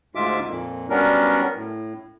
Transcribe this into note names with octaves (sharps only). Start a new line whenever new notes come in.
D2 G#2 G#3 F4 E5 D6
F2 A#2
F#3 G3 B3 C#4 D4 A#4
A2